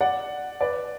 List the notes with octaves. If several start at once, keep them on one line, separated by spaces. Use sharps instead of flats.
D5 F#5
B4 D5